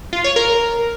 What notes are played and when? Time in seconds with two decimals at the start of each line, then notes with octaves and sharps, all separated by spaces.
0.13 F4
0.24 C#5
0.36 A#4